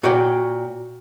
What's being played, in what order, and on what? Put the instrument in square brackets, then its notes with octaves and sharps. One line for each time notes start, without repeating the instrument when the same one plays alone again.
[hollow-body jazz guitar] A#2 F#4 C#5 D5 G5